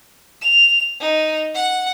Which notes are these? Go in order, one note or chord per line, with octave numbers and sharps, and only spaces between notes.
F7
D#4
F#5